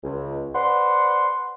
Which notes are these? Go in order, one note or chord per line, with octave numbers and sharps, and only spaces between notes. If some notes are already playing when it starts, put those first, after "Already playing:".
C#2
B4 C5 D5 F#5 C6